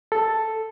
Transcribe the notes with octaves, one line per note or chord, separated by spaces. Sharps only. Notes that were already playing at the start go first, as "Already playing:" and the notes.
A4